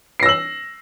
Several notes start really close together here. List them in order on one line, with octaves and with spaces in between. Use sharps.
C7 A#6 E6 F#7